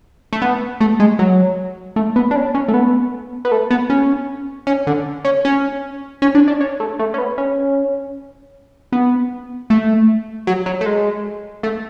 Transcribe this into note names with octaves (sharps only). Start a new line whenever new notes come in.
A3
B3
A3
G#3
F#3
A3
B3
D4
C#4
C#4
A3
B3
B3
A3
B3
C#4
C#4
D3
C#4
C#4
C#4
D4
D4
C#4
A3
A3
C#4
B3
C#4
B3
A3
F#3
F#3
A3
G#3
A3